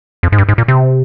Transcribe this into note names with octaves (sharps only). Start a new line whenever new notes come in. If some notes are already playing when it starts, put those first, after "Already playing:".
F2
G#2
G2
G#2
A#2
C3